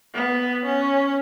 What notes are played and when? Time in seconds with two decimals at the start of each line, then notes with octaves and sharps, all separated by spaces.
0.14 B3
0.65 C#4